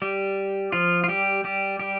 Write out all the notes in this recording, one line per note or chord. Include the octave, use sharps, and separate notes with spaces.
G3 G4
F3 F4
F4
G3 G4
G3 G4
G3 G4